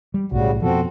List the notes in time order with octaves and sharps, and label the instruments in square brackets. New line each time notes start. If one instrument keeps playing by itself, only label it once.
[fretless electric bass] G3
[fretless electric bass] B1 A2 [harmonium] C#3 G3 F#4
[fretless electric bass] F2 B2 F3 [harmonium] C4 F#4 A4